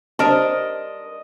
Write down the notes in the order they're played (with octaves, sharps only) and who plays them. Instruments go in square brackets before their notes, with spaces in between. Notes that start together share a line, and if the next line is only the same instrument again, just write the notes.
[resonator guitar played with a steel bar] D4 A#4 A5 [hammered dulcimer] D#5